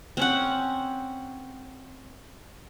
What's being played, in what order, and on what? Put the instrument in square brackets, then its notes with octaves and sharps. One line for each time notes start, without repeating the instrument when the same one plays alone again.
[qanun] C4 C#4 F#5